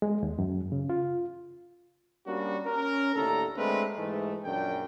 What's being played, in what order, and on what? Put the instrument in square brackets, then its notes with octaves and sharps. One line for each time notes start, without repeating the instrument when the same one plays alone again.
[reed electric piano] G#3
D#2
F#2
C#3
F4
[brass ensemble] G3 A#3 C#4 D4 F#4
C#4 A#4
D#2 A2 D3 A4 A#5
D3 G#3 A3 C4 A#4 B4
G#2 E3 G#3 A3
A#1 F#2 A#2 D4 G5